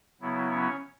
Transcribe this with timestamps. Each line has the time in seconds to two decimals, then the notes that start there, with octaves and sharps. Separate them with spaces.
0.21 C#3 F#3 B3 E4
0.50 C#4 C#5